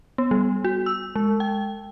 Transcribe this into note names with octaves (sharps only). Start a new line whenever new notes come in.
B3
G3
F#4
E6
G#3
G5